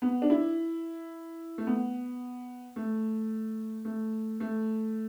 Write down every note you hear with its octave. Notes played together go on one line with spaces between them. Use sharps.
B3
D4
E4
A3
B3
A3
A3
A3